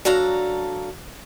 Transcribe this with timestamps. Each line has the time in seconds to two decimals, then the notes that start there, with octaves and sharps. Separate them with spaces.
0.05 F#3 D4 A4 F5 A#5